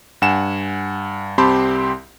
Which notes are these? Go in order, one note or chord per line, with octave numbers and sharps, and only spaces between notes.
G2 F#5 G#5 E7
C2 C4 G4 A5 B5 C6